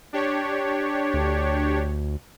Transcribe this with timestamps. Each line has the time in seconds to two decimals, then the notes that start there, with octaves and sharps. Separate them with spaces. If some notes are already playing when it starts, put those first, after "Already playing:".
0.13 D4 G4 C#5
1.14 D2